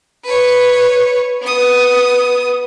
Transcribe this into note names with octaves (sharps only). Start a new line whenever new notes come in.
B4 C#5
B3 D#6